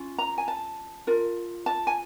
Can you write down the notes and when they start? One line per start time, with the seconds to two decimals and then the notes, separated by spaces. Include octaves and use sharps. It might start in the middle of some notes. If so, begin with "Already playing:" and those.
Already playing: C#4 F4
0.18 A#5
0.38 G#5
0.48 A5
1.07 F4 A#4
1.66 A5
1.87 G#5